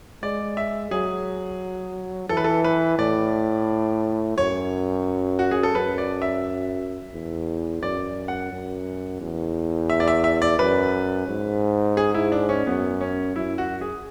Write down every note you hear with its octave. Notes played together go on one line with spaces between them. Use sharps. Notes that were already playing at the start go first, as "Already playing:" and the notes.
G#3 D5
E5
F#3 G#4
E3 A4
B4
A4
B4
A2 D5
F#2 C#5
F#4
G#4
A4
F#2 B4
D5
E5
E2
F#2 D5
F#5
F#2
E2
E5
D5
E5
E5
D5
F#2 B4
G#2
G#4
E4
D4
C#4
F#2 B3
C#4
F#2 E4
F#4
G#4